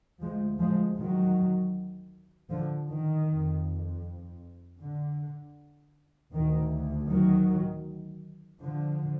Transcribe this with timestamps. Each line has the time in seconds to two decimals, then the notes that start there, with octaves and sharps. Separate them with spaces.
0.21 D2 F3 G#3
0.59 F3 G#3
0.98 D#3 F#3
2.50 D3 F3
2.88 D#3
3.27 F2
4.80 D3
6.33 D2 D#3
7.09 D#3 F#3
8.62 D3 F3